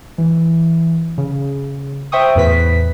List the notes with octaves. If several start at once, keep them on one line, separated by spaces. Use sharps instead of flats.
E3
C#3
C5 E5 G5 C#6 D#6
E2 A2 B4 B6